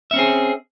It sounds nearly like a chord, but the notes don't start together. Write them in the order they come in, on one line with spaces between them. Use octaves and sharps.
E5 C#4 C4 G#4